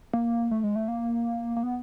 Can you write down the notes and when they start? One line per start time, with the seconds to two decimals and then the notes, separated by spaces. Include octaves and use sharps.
0.14 A#3
0.51 A3
0.64 G#3
0.76 A3
0.88 A#3
1.57 A#3
1.63 B3